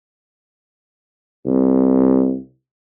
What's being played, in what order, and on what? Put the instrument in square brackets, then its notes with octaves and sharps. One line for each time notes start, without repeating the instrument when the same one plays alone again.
[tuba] C2